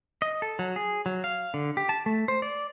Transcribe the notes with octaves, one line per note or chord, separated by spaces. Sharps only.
D#5
A4
F#3
G#4
F#3
F5
D3
G4
A5
A3
C5
D5